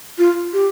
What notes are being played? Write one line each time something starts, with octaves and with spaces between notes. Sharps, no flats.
F4
G4